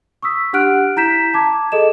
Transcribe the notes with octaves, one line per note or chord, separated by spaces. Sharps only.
C#6 D#6 E6 B6
D4 G4 F#5 F6 F#6 D7
E4 A#5 G6 B6 E7
A5 D6 G#6
G#4 A4 D#5 E7